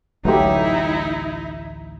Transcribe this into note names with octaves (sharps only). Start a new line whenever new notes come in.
A1 D2 F#3 A3 D#4 E4 G4